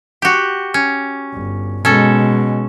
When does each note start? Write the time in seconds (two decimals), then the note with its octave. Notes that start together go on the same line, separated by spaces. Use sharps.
0.22 F#4 G4
0.74 C#4
1.34 G1
1.85 B2 G#3 C#4 A4